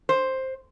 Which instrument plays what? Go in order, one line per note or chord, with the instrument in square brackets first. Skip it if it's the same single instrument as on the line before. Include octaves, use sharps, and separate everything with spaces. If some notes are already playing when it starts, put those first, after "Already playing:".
[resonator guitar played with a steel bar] C5